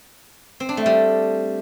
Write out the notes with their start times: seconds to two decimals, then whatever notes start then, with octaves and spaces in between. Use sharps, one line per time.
0.60 C4
0.69 D4
0.77 A3
0.86 G3